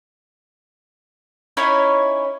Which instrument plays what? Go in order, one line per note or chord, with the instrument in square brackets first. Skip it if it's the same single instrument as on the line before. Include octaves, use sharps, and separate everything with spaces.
[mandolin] C#4 D#4 E4 C#5